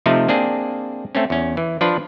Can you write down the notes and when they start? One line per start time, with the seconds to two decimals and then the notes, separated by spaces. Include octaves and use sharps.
0.06 C3 F3 A3 D#4
0.28 A#3 C4 D4 G#4
1.15 A3 C4 C#4
1.30 E2 C#4
1.57 E3
1.81 F3 D4 F4 B4